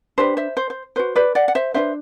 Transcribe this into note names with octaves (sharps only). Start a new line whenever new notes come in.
D4 G4 B4 C5
C5 E5
C5
C5
F#4 B4 C5
B4 D5
D5 F#5
F#5
C5 E5
D4 F#4 B4 C5 E5